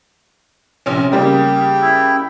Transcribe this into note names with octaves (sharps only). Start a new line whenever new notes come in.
A#1 C3 C#4
C#3 G3 A#3 G5
E4